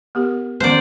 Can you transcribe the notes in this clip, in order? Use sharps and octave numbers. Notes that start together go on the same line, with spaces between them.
B3 G4 A#4
D#3 B3 C#4 C5 D5